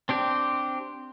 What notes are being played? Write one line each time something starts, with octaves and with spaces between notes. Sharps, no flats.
C4 D4 G4